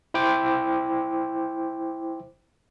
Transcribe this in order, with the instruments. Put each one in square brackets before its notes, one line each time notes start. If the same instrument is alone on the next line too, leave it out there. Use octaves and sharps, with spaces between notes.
[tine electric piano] E4 C5 G5 D6